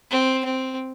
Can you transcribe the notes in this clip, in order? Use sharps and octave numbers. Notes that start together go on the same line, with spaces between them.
C4
C4